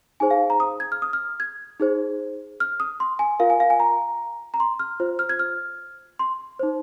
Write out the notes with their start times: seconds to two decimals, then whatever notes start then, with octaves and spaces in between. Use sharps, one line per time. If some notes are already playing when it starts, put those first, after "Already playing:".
0.20 D#4 G#4 C5 G#5
0.31 F5
0.50 A#5
0.60 D#6
0.80 G#6
0.92 F6
1.02 D#6
1.13 F6
1.40 G#6
1.80 D#4 G#4 C5
2.60 F6
2.80 D#6
3.00 C6
3.19 G#5
3.39 F4 A#4 F5
3.50 G#5
3.60 F5
3.70 G#5
3.80 A#5
4.54 A#5
4.60 C6
4.79 F6
5.00 F4 C5
5.19 F6
5.29 G#6
5.39 F6
6.19 C6
6.59 D#4 C5